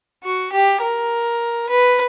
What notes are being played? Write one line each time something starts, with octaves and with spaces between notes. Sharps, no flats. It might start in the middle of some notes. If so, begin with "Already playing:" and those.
F#4
G4
A#4
B4